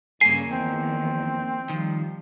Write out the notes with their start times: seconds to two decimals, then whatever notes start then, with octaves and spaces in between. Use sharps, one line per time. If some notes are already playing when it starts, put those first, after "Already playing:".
0.21 G2 C#3 A#3 G#5 C7
0.51 E2 D#3 F3 C4
1.69 D#3 F3 G3